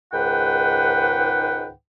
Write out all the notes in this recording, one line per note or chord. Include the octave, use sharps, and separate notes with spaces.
C#2 G#2 D#3 B4 F#5 G5